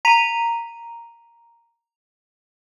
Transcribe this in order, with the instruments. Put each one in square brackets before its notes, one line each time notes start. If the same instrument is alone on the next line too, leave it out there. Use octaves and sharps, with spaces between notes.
[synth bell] A#5 B6 D#7 F7